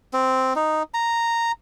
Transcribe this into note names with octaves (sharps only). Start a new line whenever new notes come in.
C4
D#4
A#5